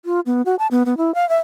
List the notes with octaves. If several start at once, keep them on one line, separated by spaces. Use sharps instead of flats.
F4
B3
F#4
A5
B3
B3
E4
F5
E5